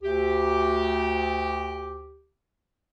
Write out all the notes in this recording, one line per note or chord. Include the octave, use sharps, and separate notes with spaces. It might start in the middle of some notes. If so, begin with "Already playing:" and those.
D2 G4